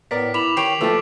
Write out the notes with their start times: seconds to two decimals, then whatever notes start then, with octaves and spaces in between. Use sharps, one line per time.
0.11 A2 B3 A#4 D5 B6
0.34 E4 B5 D6 F7 F#7
0.57 D#3 G4 C#5 G5 C7 D7 F7
0.81 F3 A3 A4 B4 E5 A5